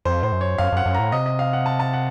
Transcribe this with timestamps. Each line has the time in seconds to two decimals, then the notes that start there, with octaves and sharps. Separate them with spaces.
0.05 F2 C5
0.23 A2 C5
0.32 F#2
0.41 C#5
0.58 F#2 F5
0.72 F#2
0.77 F#5
0.86 F#2
0.94 A2 A#5
1.12 C3 D#5
1.26 D#5
1.39 F5
1.53 F#5
1.66 A5
1.80 A5
1.93 F#5